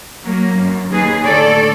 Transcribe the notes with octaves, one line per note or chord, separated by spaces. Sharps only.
F#3 A#3
F#2
D#2 G#4 B4
A2 D3 A4 C#5 D5